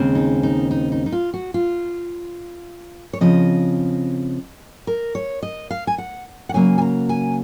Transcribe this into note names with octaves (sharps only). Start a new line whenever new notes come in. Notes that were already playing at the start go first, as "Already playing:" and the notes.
Already playing: D#2 C#3 G#3 C4
D#4
D#4
D#4
D#4
D#4
F4
F#4
F4
C#5
C#3 F3 C4 D#5
A#4
C#5
D#5
F5
G#5
F#5
F#5
C#3 F#3 A#3 G#5
G#5
A#5
G#5